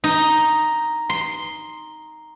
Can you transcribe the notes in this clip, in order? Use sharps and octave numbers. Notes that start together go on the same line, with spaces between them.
D#4
C6